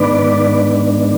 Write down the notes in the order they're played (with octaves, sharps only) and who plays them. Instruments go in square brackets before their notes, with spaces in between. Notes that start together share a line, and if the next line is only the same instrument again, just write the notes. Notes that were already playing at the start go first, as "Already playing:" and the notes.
Already playing: [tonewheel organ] G#2 D#3 B3 D4 B4 D5